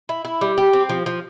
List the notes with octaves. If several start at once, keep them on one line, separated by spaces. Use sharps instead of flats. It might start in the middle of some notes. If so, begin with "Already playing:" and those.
E4
E4
G3
G4
C4
F3
F3